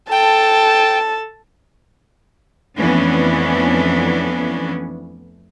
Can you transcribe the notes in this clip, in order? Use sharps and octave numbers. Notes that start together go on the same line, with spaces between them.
A4 G5 A5
F2 E3 A3 B3 C#4 D4